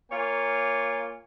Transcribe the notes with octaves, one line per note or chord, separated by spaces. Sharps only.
A#3 F4 C#5 G#5